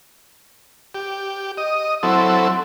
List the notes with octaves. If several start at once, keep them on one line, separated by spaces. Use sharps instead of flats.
G4
D#5
F#3 C4 E4 A4